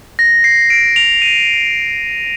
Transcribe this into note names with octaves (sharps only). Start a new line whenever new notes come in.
A#6
C7
D7
F7
D#7